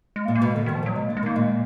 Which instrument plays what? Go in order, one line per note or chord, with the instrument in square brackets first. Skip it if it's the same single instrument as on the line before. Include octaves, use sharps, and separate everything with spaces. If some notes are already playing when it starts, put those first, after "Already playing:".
[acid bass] G#3
A#3
[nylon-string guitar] A#2
[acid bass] A#3
[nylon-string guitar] B2 [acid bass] G#3
[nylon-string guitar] A#2 [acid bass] D3
[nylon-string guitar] B2 [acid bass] D#3
[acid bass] F3
[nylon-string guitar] A#2 [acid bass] F#3
[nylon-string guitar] B2 [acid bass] G#3
[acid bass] A#3
[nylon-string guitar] D3
[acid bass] G#3
[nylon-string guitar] D#3 [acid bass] A#3
[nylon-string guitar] A#2 [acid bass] G#3